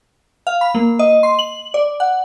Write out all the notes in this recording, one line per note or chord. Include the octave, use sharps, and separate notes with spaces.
F5
B5
A#3
D#5
C6
F#7
D5
F#5